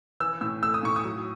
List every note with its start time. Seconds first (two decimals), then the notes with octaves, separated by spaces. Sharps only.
0.20 E3 E6
0.41 A2 E6
0.63 A3 E6
0.74 D#6
0.83 A2 C#6
0.96 D#6
1.04 F#3